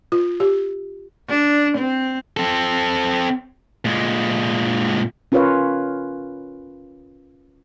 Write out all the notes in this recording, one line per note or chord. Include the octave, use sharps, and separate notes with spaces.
F4
G4
D4
C4
C4 A4
A#2 G#3
C#4 F4 A#4 B4 C#5 F5